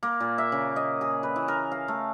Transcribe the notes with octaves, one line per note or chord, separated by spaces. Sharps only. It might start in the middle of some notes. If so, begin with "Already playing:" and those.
A#3
A#2
E5
C#3
D#5
G#4
B4
E3
A#4
F5
A3